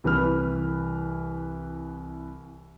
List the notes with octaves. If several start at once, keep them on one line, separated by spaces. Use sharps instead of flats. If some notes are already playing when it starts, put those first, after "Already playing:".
C2 E3 B4 F6